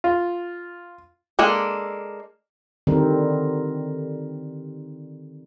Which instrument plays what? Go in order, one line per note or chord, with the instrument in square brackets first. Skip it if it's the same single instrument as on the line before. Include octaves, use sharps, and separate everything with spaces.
[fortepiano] F4
[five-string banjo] G#3 A#3 D4 A4
[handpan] D3 D#3 G3 C4 A#4